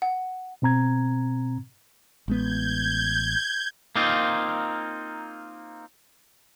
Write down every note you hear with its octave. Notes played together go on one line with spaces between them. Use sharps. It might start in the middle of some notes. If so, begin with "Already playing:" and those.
F#5
B2 C4 A#5 G#6
A1 G#3 B3 G6 G#6
A#3 C4 D#4 F4